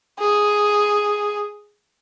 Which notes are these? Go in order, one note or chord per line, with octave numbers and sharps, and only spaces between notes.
G#4